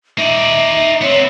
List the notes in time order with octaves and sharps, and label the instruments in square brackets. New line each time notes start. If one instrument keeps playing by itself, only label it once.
[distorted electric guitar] D#4 D5 [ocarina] E5
[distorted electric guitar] B3 C4 [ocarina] C#5